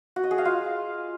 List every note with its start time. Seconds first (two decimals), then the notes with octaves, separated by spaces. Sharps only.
0.16 F#4
0.23 D#5
0.31 G#4
0.38 F5
0.45 F4